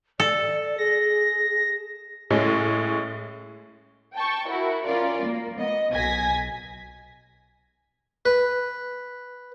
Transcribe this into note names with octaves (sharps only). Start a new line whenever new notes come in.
A4 D5
G#4 A#6
A2 G#3 C#4
G5 A5 C#6
E4 F#4 A#4
C#4 F4 A#4 D5
A#3
B3 D#5
B1 B2 G#5 G#6 A#6 B6
B4